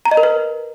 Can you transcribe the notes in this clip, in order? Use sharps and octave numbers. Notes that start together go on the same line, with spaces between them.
A#5
D#5
A#4
B4